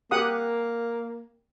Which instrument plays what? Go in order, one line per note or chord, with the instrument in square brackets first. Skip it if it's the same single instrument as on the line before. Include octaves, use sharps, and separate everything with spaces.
[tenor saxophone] A#3 [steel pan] G4 F#5 D#6